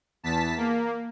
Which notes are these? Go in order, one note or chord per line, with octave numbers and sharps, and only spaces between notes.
E2 A5 B6
A#3